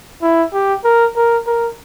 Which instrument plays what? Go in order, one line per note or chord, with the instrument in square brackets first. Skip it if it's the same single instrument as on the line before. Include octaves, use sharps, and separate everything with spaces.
[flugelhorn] E4
G4
A#4
A#4
A#4